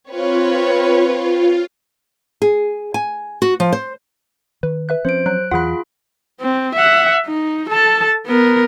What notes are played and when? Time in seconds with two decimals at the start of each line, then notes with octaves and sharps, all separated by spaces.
0.11 C4 F4 B4 C#5
2.42 G#4
2.94 G#5
3.42 F#4
3.60 F3
3.73 C5
4.63 D#3 B4
4.89 B4 E5 F#6
5.05 F3 C4 C#4 C5 D7
5.26 F#3 F#6
5.51 E2 E3 F4 G#4 F#5 B5 F#6
6.41 C4
6.75 E5 F#5
7.26 D#4
7.70 A4 A5
8.27 B3 A#4